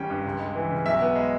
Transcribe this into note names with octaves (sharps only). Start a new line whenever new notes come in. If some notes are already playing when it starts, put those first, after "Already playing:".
Already playing: G#1 G3 C#4 G5
G2
C#2
G#3
E3
C#3
B1 E5
B3
G#3